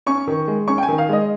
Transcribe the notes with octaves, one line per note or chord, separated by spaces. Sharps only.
C#4 C#6
D#3
G#3
C#4 C#6
G5
G#5
D#3
F5
G#3 D#5